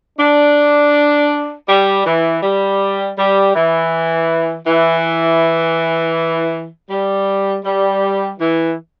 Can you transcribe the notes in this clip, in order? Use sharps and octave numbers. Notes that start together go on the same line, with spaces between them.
D4
G3
E3
G3
G3
E3
E3
G3
G3
E3